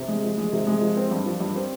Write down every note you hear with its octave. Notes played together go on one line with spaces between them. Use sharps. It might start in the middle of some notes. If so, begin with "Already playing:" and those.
Already playing: C3
G#3
F3
G#3
C3
G#3
F3
C4
G2
F3
G2
C4